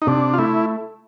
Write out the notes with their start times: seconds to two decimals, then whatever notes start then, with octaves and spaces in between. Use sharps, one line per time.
0.02 D#4
0.07 C3 D4
0.33 F4
0.38 A3 E4